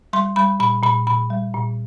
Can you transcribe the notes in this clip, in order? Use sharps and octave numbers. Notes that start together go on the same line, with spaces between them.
G3 C6
G3 B5
A#2 B5
A#2 B5
A#2 B5
G3
A#2